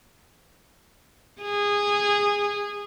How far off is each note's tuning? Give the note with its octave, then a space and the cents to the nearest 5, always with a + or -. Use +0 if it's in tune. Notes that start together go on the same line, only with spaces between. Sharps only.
G#4 -20